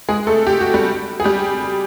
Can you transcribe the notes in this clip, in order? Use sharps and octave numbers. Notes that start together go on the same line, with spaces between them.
G#3 G#4
A3 A4
G4
F#4
G3 G4
G#4
G3 G4